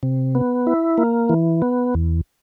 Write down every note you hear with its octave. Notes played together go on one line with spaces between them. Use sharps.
C3
B3
E4
A#3
E3
B3
E2